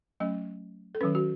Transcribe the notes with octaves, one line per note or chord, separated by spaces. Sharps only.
F#3 A3 C#4 D#5
A4
D#3 F#3 C#4 B4
F#4